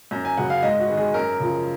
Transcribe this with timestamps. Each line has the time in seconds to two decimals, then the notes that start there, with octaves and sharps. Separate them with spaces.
0.11 F#2 A#5
0.25 G#5
0.37 C#3 F#3 B3 F#5
0.50 F5
0.63 G#2 D#5
0.80 F#4
0.88 D#3 G#3 B3
0.97 G#4
1.14 F#2 A#4
1.40 C#3 F3